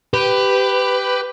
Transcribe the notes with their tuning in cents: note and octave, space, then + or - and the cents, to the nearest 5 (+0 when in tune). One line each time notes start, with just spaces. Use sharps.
G4 +0 B4 +15